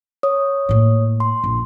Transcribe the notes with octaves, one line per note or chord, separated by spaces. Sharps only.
C#5 D#6
A2 A#3
C6
A#1